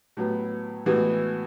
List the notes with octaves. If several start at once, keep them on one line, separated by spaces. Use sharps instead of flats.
A2 F#3 B3
A2 E3 G#3 B3 F#4